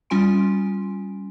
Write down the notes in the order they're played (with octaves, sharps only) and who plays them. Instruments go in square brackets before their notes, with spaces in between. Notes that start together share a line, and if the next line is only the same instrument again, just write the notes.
[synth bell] G3 C#4 F4 G#5 C6 D7